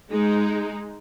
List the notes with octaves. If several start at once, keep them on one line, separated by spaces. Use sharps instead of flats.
G#3 D#4